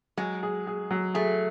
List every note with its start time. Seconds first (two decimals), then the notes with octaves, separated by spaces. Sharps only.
0.17 F#3 G#3
0.43 G#4
0.67 G#4
0.91 F#3
1.14 A3 G#4